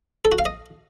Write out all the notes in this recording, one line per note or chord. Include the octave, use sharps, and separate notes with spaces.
A4
F#4
F5
D#5